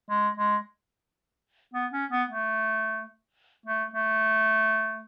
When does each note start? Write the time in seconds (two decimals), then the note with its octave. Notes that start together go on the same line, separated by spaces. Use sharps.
0.10 G#3
0.37 G#3
1.74 B3
1.92 C#4
2.11 B3
2.29 A3
3.66 A3
3.94 A3